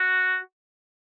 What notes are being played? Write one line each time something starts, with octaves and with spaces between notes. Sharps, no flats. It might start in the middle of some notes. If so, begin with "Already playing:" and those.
Already playing: F#4